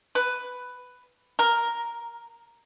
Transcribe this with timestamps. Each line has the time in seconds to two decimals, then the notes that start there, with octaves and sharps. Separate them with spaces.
0.15 B4
1.39 A#4